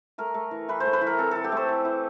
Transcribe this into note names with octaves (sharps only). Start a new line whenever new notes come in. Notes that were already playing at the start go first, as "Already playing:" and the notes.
A3 A#4
A3
E3
E3 B4
C5
A3
B4
E3
A#4
C4 A4
E3 A4
G4
A3 C5
E3
E3